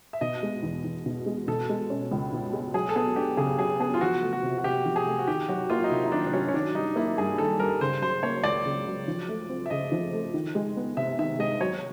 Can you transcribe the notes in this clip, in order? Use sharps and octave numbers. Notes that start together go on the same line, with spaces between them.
E5
B2 D#5
G#3
E2
E2
B2
G#3
B2 A4
G#3
C#4
C#2
B2
G#3
F#3 G#4
A4
B3 G#4
D4 G4
C#3 G#4
F#3 G#4
B3 G#4
F4
F3 F#4
A3
F#4
C3
F#4
C3 G4
F3
G#4
A3
F#4
D#3 G4
F#3 F#4
A#3 F4
D#4
C3 E4
D#4
D#3 D4
D4
F#3 C#4
C#4
D#3 D4
G3 D#4
A#3 E4
G2 G#4
D#3 A4
G3 A#4
C#3 C5
F#3 C5
A#3 C#5
C#2 D5
C#3
F#3
F3
A3
C4
E5
C#3 D#5
F3
A3
D#3
G#3
B3
C3 E5
D#3 E5
G#3 D#5
F#3 C#5